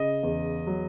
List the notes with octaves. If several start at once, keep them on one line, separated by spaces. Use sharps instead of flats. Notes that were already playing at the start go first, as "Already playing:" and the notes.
Already playing: C#3 D#5
E2
F#3